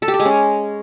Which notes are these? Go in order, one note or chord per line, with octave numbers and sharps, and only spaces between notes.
A4
G4
A4
G#3
C#4